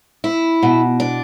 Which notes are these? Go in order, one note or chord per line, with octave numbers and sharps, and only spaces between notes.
E4
B2
D4